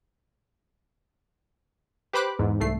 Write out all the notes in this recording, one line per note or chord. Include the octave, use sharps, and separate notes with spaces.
G4 B4 C5 B5 D6 F#6
E2 G#2
C2 A3 C7